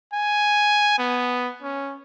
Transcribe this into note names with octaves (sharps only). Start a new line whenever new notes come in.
G#5
B3
C#4